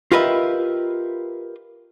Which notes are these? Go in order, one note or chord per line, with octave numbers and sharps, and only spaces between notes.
F4 G4 A#4 B4 D#5 E5